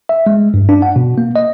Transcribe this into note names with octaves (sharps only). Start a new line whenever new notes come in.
E5
G#3
G2
D4
F#5
B2
A#3
D#5